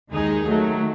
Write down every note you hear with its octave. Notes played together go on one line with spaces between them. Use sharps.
D#2 D#3 G#3 D#4 G#4
D#3 F#3 A3